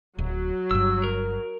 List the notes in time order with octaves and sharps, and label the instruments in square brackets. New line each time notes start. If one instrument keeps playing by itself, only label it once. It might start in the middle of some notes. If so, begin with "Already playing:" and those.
[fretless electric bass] D1 [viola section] F#3
[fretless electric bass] G1 G2 [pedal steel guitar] E6
[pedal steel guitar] A#4